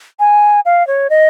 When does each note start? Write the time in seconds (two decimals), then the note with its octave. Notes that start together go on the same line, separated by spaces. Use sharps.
0.20 G#5
0.65 F5
0.87 C#5
1.10 D#5